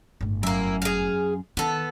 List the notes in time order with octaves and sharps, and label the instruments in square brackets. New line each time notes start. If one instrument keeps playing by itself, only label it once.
[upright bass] G1 A2
[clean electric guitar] F#2 [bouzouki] A#3 E4
[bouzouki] G#4 F5
[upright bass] D#3 [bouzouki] B3 A4